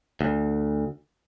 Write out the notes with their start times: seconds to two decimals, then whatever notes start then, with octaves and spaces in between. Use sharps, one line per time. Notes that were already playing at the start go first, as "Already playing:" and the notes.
0.21 D2